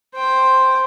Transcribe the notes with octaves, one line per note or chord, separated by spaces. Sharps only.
C5 G5